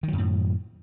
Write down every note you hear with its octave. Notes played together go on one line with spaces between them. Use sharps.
F#2 A2 D#3 F#3